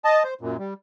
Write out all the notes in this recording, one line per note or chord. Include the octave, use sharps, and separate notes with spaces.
D#5 A5
C5
F#2 A#2
G3